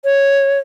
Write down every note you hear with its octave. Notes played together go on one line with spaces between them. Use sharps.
C#5